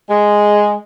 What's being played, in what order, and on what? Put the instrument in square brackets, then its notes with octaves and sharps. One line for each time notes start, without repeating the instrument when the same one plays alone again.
[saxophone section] G#3